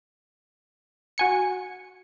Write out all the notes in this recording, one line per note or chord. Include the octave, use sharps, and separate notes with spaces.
F#4 G#5 C#7